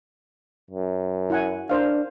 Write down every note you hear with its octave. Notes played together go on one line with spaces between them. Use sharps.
F#2
E4 F#5 G#5
D4 A#4 C5 F5